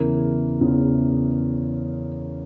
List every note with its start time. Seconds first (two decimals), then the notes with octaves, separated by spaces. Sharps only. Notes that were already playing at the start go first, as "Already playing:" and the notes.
Already playing: E2 C#3 E3 A#4
0.61 E2 C#3 E3